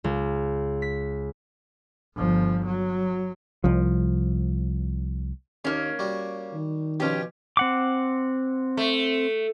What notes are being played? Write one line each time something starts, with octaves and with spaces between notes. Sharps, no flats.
C#2
B6
G1 F3
F#3
C2 F3
D#2 A#3 C#4
G3 F#4
D#3
B2 F3 C#4 G4
C4 F#5 D6
A3